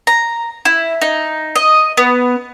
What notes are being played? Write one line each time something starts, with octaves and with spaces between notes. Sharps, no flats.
A#5
E4
D#4
D#5
B3